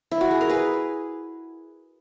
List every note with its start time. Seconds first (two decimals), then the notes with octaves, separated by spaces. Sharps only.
0.11 E4
0.21 F#4
0.31 G#4
0.41 A#4
0.49 G#4 B4